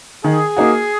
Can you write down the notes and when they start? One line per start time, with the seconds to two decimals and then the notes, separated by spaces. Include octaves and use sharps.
0.24 D#3 G#4
0.57 A#3 D#4 F#4